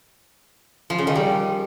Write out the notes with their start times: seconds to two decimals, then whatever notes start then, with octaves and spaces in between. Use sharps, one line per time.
0.90 F3
0.99 C#3
1.07 D#3
1.16 G3